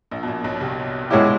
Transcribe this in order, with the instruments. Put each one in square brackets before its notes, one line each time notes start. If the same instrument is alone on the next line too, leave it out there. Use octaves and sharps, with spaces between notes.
[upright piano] A#1 A#2
B2
A#1 A#2
B1 B2
C2 C3
[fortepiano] B2 G#3 C#4 E4 G4